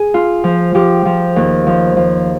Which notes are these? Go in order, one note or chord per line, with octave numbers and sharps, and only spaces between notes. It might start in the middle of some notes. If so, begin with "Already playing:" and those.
Already playing: G#4
F4
F3
F3 G4
F3
D#2
F3
F3